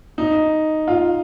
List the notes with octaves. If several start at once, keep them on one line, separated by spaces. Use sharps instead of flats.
D#4
F4